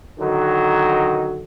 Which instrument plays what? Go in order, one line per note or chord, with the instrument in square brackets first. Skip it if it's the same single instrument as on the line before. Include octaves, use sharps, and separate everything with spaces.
[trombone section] D3 D#3 F#3